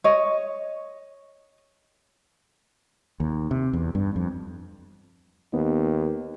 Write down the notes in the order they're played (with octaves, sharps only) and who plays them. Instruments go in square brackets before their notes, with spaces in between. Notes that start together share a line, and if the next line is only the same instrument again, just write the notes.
[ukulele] C#5 D#5
[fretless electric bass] D#2
C3
E2
G2
F2
[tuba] D#2 [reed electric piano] B3 D#4